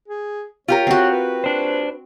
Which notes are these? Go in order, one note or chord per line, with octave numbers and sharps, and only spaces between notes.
G#4
F4 G4 A#4 C#5
C4 F#4
B4
D4 C5